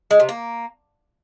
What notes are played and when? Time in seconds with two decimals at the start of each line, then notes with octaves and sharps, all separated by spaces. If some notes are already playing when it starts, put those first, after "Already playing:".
0.11 G#3
0.20 C3
0.29 A#3